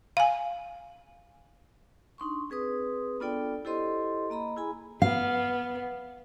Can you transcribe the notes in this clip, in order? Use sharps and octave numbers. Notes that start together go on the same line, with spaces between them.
F5 G#5
D4 D#4 C6 C#6
C4 G#4 B4 D#6
B3 D4 F4 A4 D5 G5
E4 G4 A4 C5 D#5 C6
A#3 D#5 A#5 B5
E4 G#4 G#5 B5
B3 F5